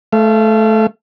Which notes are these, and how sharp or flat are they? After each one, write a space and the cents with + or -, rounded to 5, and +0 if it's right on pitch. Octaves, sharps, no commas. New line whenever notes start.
A3 -15 F5 -40